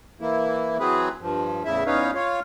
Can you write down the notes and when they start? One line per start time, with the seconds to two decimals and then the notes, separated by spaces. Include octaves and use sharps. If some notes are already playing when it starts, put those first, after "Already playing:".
0.21 E3 A#3 E4
0.79 E3 F#3 C4 G#4 B4
1.21 G2 F3
1.65 E2 A2 C#3 E4 E5
1.86 E2 C#4 D#4 B4 C#5 F5
2.14 F4 C#5 F5